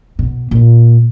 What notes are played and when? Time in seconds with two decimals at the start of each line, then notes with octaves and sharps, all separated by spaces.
0.19 B2
0.51 A#2